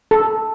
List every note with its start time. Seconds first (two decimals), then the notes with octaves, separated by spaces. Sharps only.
0.11 A4